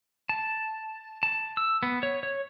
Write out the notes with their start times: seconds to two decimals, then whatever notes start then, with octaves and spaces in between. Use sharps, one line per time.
0.29 A5
1.23 A5
1.57 E6
1.83 B3
2.03 C#5
2.23 C#5